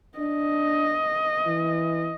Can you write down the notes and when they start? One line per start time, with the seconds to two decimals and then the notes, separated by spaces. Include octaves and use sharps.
0.18 D4 D#5
1.46 E3